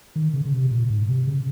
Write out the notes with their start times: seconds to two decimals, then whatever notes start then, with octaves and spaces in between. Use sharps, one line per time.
0.16 D#3
0.34 C#3
0.45 C#3
0.53 C3
0.71 A#2
0.90 G#2
1.08 C3
1.27 C#3